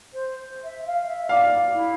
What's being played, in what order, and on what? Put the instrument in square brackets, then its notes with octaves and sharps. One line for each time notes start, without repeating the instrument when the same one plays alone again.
[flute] C5
E5
F5
E5
[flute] D5 [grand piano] F5
[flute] E4